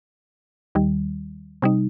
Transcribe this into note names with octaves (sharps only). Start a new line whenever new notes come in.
D#2 D#3 G3
C3 G3 D#4